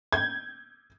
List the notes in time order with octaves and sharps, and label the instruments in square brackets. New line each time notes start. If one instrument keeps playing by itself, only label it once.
[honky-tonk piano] G6 G#6